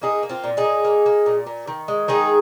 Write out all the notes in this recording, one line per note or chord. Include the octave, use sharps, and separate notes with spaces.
A#3 D#4 G#4
A#3
C4 F4
A#2
D#4 G#4
A#2
A#3
A#3
A#2
A#2
D#3
G#3
D#3 D#4 G#4